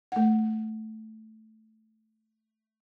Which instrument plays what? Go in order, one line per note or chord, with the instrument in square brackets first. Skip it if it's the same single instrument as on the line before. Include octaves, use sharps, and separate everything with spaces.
[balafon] A3 F#5